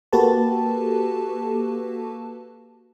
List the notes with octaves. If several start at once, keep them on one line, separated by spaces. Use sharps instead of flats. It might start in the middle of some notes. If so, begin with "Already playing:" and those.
A#3 F#4 G4 A4 B4 A5